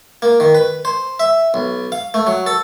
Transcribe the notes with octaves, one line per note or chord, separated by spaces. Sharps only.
A#3
D#3
B4
C5
E5
B1
F5
A3
F#3
A4